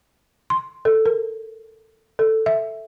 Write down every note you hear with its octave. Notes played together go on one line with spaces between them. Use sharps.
C6
A4
A#4
A4
E5